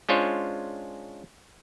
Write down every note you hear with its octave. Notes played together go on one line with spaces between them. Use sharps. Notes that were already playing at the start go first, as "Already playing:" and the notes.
G#3 C#4 D4 F4 C5 C#5